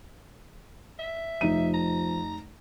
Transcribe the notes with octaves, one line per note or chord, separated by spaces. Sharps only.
E5
F1 F3 D#4 D#7
A#5